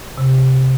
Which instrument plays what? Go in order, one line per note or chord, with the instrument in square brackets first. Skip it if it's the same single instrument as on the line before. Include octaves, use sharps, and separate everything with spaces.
[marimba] C3